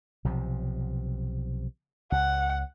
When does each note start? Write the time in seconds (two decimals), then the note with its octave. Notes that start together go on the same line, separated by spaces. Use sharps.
0.24 B1 C3 F3
2.12 C#2 F#5